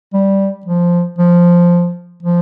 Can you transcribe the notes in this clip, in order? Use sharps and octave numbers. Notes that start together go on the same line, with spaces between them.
G3
F3
F3
F3